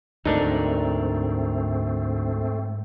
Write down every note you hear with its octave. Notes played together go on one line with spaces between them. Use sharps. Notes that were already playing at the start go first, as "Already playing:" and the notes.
D2 G#2 A3 C4 D4 D#4 A#4 D5